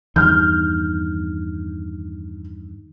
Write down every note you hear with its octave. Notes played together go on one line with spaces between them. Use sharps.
E2 G2 D#3 F6 G6